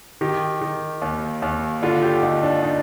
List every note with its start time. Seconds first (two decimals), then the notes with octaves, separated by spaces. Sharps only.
0.21 D#3 G4
0.61 D#3
1.02 D#2
1.42 D#2
1.82 D3 F4
2.03 G4
2.23 D3 D#4
2.43 D4
2.63 D#4